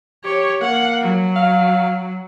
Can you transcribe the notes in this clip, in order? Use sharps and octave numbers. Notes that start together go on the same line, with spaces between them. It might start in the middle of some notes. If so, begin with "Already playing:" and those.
G4 C#5
A#3 F#5
F#3
F5